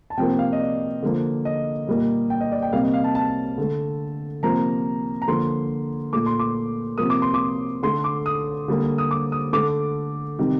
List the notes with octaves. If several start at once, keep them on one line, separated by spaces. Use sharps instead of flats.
A5
C3 F3 A#3 G5
F5
D#5
D5
D3 F3 A#3
D#5
A#2 G3 A#3
G5
D#5
D5
G5
C3 G3 A#3 F5
D#5
F5
A5
A5
D3 A3
C3 F3 A#3 A#5
A#5
D3 F3 A#3 C6
A#2 A3 D6
C6
D6
C3 F3 A#3 D#6
D6
C6
D6
D3 A3 C6
D6
D#6
D3 G3 A#3
D#6
D6
D#6
D3 A3 D6
C3 D#3 G3